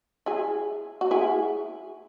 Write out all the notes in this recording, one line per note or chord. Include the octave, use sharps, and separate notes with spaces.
E4 G#4
F#4
E4 G#4